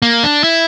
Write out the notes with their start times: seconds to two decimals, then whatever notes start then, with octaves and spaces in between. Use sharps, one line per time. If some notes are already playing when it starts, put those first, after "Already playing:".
0.02 A#3
0.23 D4
0.44 E4